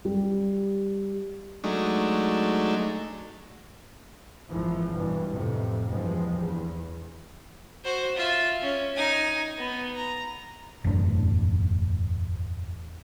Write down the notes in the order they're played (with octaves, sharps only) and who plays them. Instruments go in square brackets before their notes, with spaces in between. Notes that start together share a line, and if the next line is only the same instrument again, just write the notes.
[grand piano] G3
[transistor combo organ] F#3 G#3 A3 D4 D#4
[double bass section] G#1 E3 F3
G2 B2 E3
F2 A2 C3
E2 G2 E3 F3 G#3
E2
[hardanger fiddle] F#4 C5
F4 E5
C#4
D#4 G#5
B3
A#5
[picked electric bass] F#1 E2 A2 D4